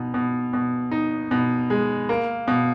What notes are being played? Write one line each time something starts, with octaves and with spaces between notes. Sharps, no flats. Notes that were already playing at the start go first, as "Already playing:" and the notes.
Already playing: B2 D#4
B2
B2
D#4
B2
G#3
A#3
B2